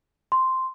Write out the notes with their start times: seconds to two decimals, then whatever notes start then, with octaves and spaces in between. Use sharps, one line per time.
0.32 C6